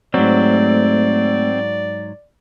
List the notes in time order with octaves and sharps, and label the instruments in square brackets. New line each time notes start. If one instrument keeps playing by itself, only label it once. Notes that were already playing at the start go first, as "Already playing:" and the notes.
[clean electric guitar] G#2 F#3 [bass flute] A3 [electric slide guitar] C4 [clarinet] D5